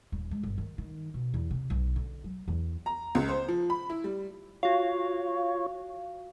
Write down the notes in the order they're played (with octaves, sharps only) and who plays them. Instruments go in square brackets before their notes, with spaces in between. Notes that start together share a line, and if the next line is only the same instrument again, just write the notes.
[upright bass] D#1
G#3
G1
D#3
D#3
B2
E2
C3
B1
D3
F#3
E2
[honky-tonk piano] A#5
C#2
C5
F3
B5
E4
G3
[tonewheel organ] F4 C#5 [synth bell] F#4 F5